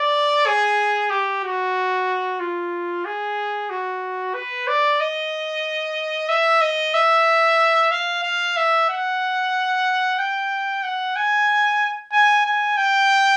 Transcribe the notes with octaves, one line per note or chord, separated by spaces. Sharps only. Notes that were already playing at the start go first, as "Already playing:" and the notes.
Already playing: D5
G#4
G4
F#4
F4
G#4
F#4
B4
D5
D#5
E5
D#5
E5
F5
F5
E5
F#5
G5
F#5
G#5
G#5
G#5
G5